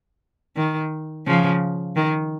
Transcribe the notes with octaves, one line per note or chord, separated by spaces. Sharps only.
D#3
C#3 F3
D#3